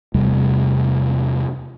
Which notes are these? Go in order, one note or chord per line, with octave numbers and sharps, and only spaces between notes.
E2 C3 G3 A3